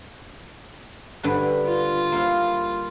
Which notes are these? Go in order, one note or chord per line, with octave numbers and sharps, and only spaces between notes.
G2 D3 B4
F4
A#3 E4 F5